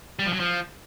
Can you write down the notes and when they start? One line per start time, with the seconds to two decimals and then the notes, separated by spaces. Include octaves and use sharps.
0.19 G3
0.26 F3
0.33 F#3
0.40 F3